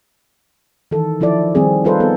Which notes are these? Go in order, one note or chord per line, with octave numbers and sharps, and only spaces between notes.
D#3 E3 A4
D#3 F3 E4 A4 D5
D#3 G3 C4 G#4
G3 D#4 F4 A4 B4 C5
B3 A4